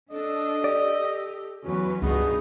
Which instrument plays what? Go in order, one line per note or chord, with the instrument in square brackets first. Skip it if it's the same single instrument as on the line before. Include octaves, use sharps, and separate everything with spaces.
[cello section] D4 [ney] A4 [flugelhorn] D#5
[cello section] G4 [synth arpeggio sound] D5
[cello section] E2 F#3 B4 [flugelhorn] C#4 [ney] F#4
[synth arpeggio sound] C#2 [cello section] G2 B2 D#4 [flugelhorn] B3 [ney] G#4